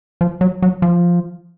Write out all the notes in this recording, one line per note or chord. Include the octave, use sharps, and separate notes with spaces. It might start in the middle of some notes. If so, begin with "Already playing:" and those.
F3
F#3
F#3
F3